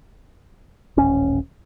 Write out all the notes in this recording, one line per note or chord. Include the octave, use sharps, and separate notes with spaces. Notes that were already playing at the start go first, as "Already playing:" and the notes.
D#1 A1 C#4